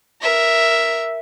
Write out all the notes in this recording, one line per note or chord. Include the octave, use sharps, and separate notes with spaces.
A#4 E5